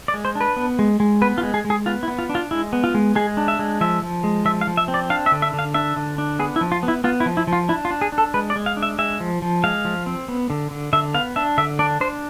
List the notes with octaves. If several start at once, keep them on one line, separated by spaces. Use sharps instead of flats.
D5
G#3
C5
D4
B4
B3
G#3
G#3
B3 B4
F4
G#3
G#4
G#3
G#4
B3 F4
E4
B3
F4
D4
F4
G#3 E4
B3
F4
G#3
G#3 G#4
D4
E5
G#3
F3 E5
F3
G#3
F3 E5
F5
F3
E5
C4
D5
D4 F5
E5
D3
E5
D3
F5
D4 E5
D3
D4
B3 G#4
E4
F3
F4
B3
E4
B3 F4
E4
F3
E4
F3
F4
D4 E4
F4
D4
G#4
D4
A4
G#3 B4
D5
G#3
F5
D4
E5
G#3 E5
F3
F3
G#3 F5
F3
C4
B3
D3
D3
D3 E5
B3 F5
D4 E5
D3 E5
D4 D5
D4 C5